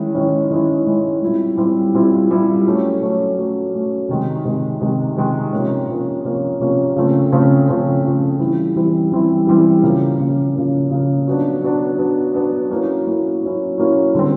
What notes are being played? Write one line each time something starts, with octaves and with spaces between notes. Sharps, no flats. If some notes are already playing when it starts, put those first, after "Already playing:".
Already playing: D#3 G#3 C#4 E4
D#3 G#3 C#4 E4
D#3 G#3 C#4 E4
D#3 G#3 C#4 E4
A#2 G3 C4 E4
A#2 G3 C4 E4
A#2 G3 C4 E4
A#2 G3 C4 E4
F#3 A3 C#4
F#3 A3 C#4
F#3 A3 C#4
F#3 A3 C#4
C3 D#3 G#3
C3 D#3 G#3
C3 D#3 G#3
C3 D#3 G#3
C3 F3 A#3 C#4
C3 F3 A#3 C#4
C3 F3 A#3 C#4
C3 F3 A#3 C#4
C#3 F3 A3 C4
C#3 F3 A3 C4
C#3 F3 A3 C4
C#3 F3 A3 C4
E3 G3 C4 E4
E3 G3 C4 E4
E3 G3 C4 E4
E3 G3 C4 E4
C#3 F3 A#3
C#3 F3 A#3
C#3 F3 A#3
C#3 F3 A#3
F#3 B3 D4
F#3 B3 D4
F#3 B3 D4
F#3 B3 D4
F#3 A#3 C#4 E4
F#3 A#3 C#4 E4
F#3 A#3 C#4 E4
F#3 A#3 C#4 E4
D3 G3 C4